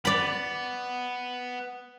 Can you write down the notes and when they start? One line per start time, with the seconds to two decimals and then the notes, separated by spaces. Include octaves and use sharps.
0.05 B3 D5 B5